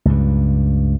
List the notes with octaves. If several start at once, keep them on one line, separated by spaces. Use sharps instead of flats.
C#2 G2